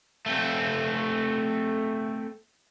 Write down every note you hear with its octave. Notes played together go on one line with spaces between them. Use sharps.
A3 C4